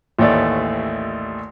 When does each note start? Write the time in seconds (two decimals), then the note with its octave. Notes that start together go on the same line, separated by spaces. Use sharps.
0.19 A1 D#2 A3 D5